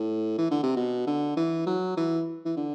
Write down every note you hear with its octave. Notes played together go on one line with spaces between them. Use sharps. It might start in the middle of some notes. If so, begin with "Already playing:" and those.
Already playing: A2
E3
D3
C3
B2
D3
E3
F#3
E3
E3
D3